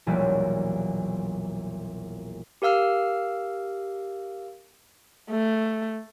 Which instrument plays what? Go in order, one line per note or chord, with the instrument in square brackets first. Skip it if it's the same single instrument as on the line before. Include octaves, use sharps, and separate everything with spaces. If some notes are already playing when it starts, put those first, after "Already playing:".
[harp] E1 A#1 F#3 G3 A#3 E5
[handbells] G4 A#4 F5 E6 F6
[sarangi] A3